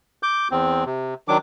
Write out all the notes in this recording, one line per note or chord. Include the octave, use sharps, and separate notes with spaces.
D6 G6
E2 C4
C3
D#3 F#3 D4 D6